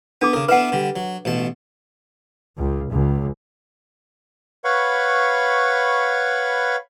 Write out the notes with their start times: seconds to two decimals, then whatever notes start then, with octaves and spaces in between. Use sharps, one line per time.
0.21 B3 D4 A4 D6
0.33 C#3 A4 A#4
0.49 B3 D4 E4 B4 F#5
0.72 D3 G3
0.96 F#3
1.25 A1 B2 A5
2.54 C#2
2.89 C#2
4.64 B4 C#5 F5 F#5 B5 C#6